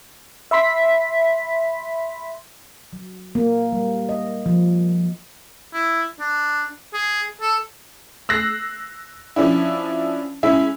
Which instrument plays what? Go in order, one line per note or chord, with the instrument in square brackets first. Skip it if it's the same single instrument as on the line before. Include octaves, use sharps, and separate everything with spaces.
[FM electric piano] E5 B5 C6 B6
[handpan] F#3
A#3
G3
D#5
F3
[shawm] E4
D4
G#4
A4
[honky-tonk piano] E6 F#6 A#6 C7
F3 C#4 D4 E4
G#3 C#4 E4 E5